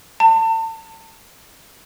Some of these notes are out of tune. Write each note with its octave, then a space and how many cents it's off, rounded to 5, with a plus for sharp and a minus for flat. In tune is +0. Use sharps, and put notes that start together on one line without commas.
A5 +35